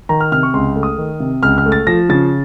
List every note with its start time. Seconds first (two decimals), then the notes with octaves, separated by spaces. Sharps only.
0.09 D#3 A#5
0.20 F6
0.32 C3 F6
0.43 C#6
0.54 C#2 C6
0.76 A3
0.83 D#6
0.98 D#3
1.20 C3
1.43 C#2 F6
1.58 F6
1.66 A3
1.72 A6
1.87 F3 A#6
2.09 C#3 A6